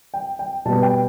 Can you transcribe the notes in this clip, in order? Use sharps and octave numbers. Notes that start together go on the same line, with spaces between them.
G5
G5
B2 G3 B3 A5
G5